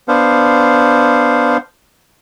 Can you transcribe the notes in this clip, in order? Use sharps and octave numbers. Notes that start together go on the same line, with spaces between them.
B3 D4 C5 F5